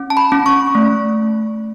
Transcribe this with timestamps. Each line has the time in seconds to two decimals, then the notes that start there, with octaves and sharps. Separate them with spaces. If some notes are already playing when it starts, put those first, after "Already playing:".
Already playing: C#4
0.10 A5
0.17 B5
0.32 C#4
0.46 C#6
0.75 A3